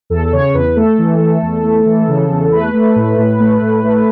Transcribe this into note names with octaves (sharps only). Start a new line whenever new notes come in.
E2 A4
C#3 C#5
E2 B4
A3 A4
E3
A3
E2
A3
E3
C#3
E2
A3 B4
A3
A2
A2
A3
A2
A3